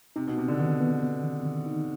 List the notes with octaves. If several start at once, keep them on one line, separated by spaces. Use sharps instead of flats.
C3 D#4
B2
C3 B3
D3
B2 D#3
B3
B3
D#3
D#3
D#4